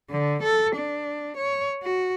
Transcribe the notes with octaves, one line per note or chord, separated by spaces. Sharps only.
D3
A4
D4
C#5
F#4